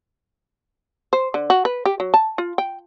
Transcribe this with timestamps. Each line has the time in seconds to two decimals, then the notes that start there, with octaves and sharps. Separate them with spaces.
1.13 C5
1.34 D3
1.50 F#4
1.65 B4
1.85 G4
2.00 F#3
2.14 A5
2.38 F4
2.58 G5